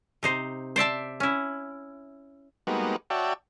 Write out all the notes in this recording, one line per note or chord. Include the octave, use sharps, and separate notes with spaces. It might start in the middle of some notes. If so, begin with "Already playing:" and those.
C3 D#4 C5
C5 D5 E5 A5
C#4 E4
G3 G#3 A#3 B3 D#4 F#4
F#4 C#5 D5 E5 G5 A5